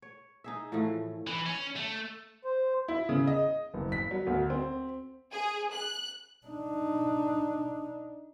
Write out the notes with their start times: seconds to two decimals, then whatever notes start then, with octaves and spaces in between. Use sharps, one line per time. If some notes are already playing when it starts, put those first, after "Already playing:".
0.02 C#5
0.44 D#4 G#4 E5
0.72 A2 E3 F3 A3
1.27 E3
1.46 C#4
1.76 A3
2.45 C5
2.88 E4
3.09 C#3
3.27 D#5
3.74 F#1
3.92 B6
4.11 F#3
4.27 D2
4.50 C4
5.32 G#4
5.73 F#6
6.47 D4 D#4